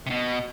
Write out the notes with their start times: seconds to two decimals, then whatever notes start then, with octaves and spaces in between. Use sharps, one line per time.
0.06 C3
0.10 B2